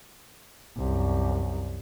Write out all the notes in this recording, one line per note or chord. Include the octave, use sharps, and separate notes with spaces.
C2 F#2